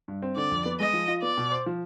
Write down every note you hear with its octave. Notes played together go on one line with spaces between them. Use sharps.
G2
C4
D3 D5
F2
B3
G#3 D#5
F3
F4
B3 D5
B2
C5
F3